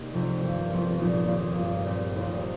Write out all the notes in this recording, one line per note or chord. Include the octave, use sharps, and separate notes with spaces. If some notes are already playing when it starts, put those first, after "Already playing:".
Already playing: C2 A#3 D#4 G4
F1 F2 C3
G2 D#3 A#3 G4
G1 F2 F3 C4 F4
A#1 A#2 F3 A#3 D#4
D#2 D#3 A#3
G2 G3 A#3 F4
A#2 G3 C4
F1 D#2 D#3 C4